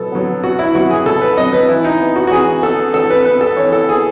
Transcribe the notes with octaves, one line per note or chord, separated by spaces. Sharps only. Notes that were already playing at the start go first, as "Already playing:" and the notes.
Already playing: B2 F#3 B3 A4
F#3 B3
B2 F#4
E4
F#3 B3 F#4
G#4
B2 A4
B4
F#3 B3 D#5
B4
E3 E4
D#4
B3
F#4
F#4
E3 G#4
B3 A4
E3 A4
B4
B3 B4
A4
E3 C#5
A4
B3 G#4